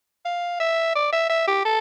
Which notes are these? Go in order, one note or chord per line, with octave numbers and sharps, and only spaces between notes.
F5
E5
D5
E5
E5
G4
A4